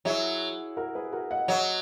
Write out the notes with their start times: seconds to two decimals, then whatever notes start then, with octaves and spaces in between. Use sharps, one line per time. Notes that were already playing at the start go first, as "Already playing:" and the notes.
0.05 F#3 E4 G#4
0.77 F#4 A#4
0.95 G#4 B4
1.12 F#4 A#4
1.31 D#5 F#5
1.48 F#3 D#5 F#5